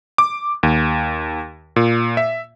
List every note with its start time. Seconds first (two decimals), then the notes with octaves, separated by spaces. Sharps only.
0.18 D6
0.63 D#2
1.76 A#2
2.17 E5